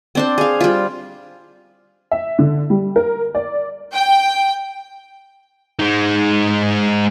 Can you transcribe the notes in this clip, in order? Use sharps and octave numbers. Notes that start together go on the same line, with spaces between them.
C4 D4 C5
G#4 F5
G3 F4
E5
D3
G3
A#4
D5
G5
G#3 D#4